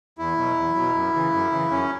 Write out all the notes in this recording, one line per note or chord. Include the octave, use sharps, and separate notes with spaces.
E2 E4
B2 F#3
E2
B2 F#3
F#2
C#3 E3
F#2
C#3 E3
F#2 C#4